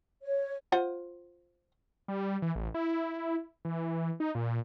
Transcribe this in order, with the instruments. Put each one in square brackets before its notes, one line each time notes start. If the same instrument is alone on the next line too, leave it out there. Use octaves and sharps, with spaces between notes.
[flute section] C#5
[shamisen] F4 C5 F#5
[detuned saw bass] G3
E3
A1
E4
E3
D#4
A#2